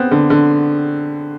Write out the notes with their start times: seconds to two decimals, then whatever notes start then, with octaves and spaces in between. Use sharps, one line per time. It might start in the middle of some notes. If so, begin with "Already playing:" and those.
Already playing: B3 C4
0.11 D3
0.30 D3